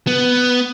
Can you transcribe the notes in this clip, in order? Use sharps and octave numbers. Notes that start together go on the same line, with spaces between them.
B3